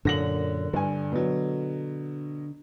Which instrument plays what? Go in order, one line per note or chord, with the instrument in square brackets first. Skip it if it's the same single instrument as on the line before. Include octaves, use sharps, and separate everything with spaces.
[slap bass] F#2 A#2 [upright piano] D3 A#6 F#7
[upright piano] G2 G#5 [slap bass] D3
[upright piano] B2 F#3